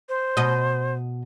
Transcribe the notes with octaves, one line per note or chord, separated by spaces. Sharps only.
C5
B2 D#5